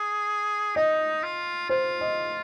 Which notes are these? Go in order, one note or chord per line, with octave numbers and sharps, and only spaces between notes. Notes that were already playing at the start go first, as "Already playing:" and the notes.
Already playing: G#4
D#4 D#5
F4
F4 C5
D#5